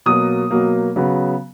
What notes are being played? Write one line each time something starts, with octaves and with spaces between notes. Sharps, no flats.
B2 F#3 A#3 D#6
B2 F#3 A#3
C#3 F#3 B3